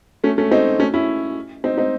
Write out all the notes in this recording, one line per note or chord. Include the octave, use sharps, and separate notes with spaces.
A3 C#4
A3 C#4
C4 D#4
A3 C#4
C#4 E4
C4 D#4
C4 D#4